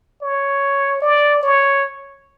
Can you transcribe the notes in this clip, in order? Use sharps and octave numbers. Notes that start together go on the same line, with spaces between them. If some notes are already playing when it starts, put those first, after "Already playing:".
C#5
D5
C#5